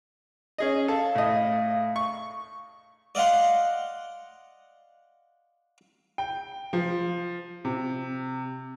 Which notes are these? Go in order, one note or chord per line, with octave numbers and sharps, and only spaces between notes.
C#4 G#4 D#5
A4 F5 A5
A2 D#5
C#6
D5 D#5 F5 F#5 C6
G5
F3
C3